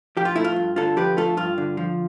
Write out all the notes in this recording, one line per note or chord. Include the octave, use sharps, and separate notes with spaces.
F3 G4
F4
A3 E4
F4
G2
D3 F4 A4
F3 G4 B4
A3 F4 A4
G2 F4
D3
F3